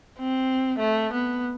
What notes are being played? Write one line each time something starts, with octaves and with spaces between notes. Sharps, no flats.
C4
A3
B3